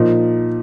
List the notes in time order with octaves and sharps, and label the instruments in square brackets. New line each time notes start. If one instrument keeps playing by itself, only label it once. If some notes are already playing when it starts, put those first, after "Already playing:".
Already playing: [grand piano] A#2 F3 D#4